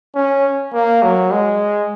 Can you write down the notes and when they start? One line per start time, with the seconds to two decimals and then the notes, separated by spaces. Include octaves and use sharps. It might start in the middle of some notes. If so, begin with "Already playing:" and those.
0.15 C#4
0.73 A#3
1.02 F#3
1.32 G#3